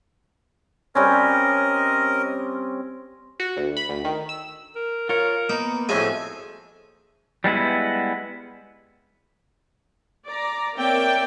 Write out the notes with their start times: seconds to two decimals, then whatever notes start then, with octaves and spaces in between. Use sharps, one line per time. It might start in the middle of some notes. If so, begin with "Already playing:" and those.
0.95 G3 C4 C#4 A#4 D#5
3.40 F#4
3.57 D2
3.77 B5
3.89 D2
4.05 D#3
4.29 E6
4.76 A#4
5.09 F4 A#4 C#5
5.49 A#3 B3 D#4
5.89 F2 A2 F#4 G#4 D#5 E5 G#5
7.44 G3 G#3 B3 E4
10.26 D5 A#5
10.75 A#3 C4 C#5 D5 E5 G5